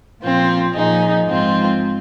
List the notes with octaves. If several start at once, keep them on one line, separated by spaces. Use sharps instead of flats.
A#2 F3 C4 F4
A#2 F3 D#4 G#4
G#2 F3 C4 F4